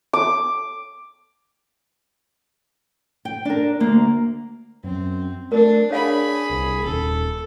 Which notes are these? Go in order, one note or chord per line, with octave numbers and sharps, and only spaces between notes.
D6
G5
D4 A#4
D2 A#3
F#2 C4
A3 D4 A#4
D4 G#4 C#5 F5 G#5 B5
C2
D#1 A4